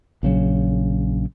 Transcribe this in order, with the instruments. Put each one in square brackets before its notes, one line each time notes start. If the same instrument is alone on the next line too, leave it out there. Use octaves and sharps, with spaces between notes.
[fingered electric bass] A#1 C#3 F#3